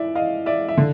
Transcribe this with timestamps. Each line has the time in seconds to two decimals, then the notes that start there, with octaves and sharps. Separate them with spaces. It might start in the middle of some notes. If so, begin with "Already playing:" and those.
Already playing: E3 D5 E5
0.15 D#5 F5
0.46 D5 E5
0.68 E5
0.77 D3